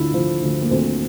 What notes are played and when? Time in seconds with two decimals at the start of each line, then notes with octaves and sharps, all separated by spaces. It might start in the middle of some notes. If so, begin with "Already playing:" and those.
Already playing: D2 D3 E4 F4
0.14 F3
0.42 D2
0.62 A#3
0.71 D2 C4